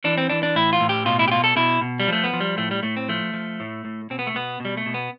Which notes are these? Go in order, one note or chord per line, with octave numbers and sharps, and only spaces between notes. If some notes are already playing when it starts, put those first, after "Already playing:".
E3 D4
C4
E3 D4
D4
A2 E4
F4
A2
G4
B2 F4
E4
G4
B2 F4
A4
B2 E4
B2
G3
F3 A3
B3
F3
G3
A2 A3
G3
A2 A3
C4
F3 A3
F3
A2
A2
B2 C4
B3
A3
B2 B3
B2 G3
A3
B2
B3